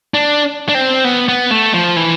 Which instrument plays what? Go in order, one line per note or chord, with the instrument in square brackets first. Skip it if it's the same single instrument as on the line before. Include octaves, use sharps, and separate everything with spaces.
[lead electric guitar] D4
D4
C4
B3
B3
A3
F3
E3